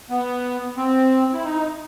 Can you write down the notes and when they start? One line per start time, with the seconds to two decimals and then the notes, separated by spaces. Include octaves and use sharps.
0.10 B3
0.77 C4
1.33 E4
1.44 D#4